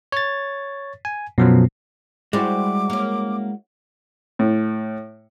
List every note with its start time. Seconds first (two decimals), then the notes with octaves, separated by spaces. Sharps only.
0.12 C#5 A6
1.05 G#5
1.38 F#2 B2 F3 F#3
2.33 G3 G#3 E4 F#4 C5 D6
2.90 A#3 C#4
4.39 A2